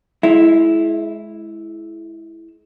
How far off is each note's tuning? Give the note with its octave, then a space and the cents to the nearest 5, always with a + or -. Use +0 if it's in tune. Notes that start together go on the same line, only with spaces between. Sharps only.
G#3 +35 E4 +0